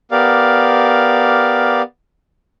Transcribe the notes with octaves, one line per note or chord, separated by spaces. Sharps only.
B3 G4 A#4 D5 F5